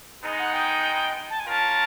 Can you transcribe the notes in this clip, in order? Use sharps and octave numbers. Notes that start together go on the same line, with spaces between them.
G#3 B3 D#4
F#5
G5
A5
G#5
C#4 F4 A#4 A5